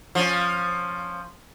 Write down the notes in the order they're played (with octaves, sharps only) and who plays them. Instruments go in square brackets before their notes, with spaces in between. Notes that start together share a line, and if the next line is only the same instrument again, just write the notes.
[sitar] F3 C#4